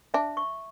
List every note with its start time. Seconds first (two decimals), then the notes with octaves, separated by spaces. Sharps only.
0.14 D4 E5
0.37 C#6